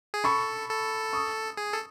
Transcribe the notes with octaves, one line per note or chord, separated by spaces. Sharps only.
G#4
A4 B5 C#6
A4
C#6 D#6
G#4
A4